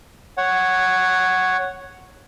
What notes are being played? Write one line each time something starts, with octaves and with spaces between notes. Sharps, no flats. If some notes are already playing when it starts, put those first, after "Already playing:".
C#5 F#5